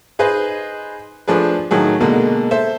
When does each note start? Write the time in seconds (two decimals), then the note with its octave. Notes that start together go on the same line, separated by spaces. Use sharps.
0.19 D#4 G#4 B4 C5 D#5
1.28 F3 A3 D4 G#4 B4
1.71 A2 D#3 F#3 G#4
2.01 B2 D3 G#3 A#3
2.51 A4 C5 E5